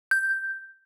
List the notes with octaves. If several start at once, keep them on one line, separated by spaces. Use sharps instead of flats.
G6